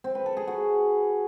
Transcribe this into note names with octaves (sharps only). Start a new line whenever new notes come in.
C4
B4
A4
G#4
F#4